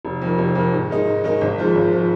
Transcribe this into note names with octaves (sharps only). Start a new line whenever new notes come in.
F1
F2 D#3
F1
F2 D#3
G#2
D#3 G#3 D#4
G#2
D#3 G#3 D#4
G#1
G#2 F3 G#3
G#1
F3 G#3